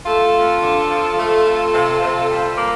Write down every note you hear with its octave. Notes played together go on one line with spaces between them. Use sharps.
A3 F4 A4
F2
D3
F3
A3
F2
C3
C3
G3
A#3